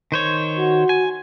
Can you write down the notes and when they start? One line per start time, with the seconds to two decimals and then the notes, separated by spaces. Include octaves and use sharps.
0.12 D#3 C5 C#5
0.57 F#4
0.89 G#5